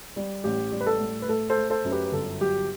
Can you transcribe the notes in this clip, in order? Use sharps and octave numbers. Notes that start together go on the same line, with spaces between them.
G3
A1 G4
G3
B4
A4
A2
B4
A3 A4
A4 C5
A3
A4 C5
F#2
G4 B4
B4
G1 A4
F#3 G4